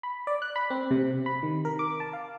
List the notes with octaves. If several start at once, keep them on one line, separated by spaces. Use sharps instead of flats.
B5
D5
F#6
B5
C4
C3
B5
D#3
A#4
D6
A5
F5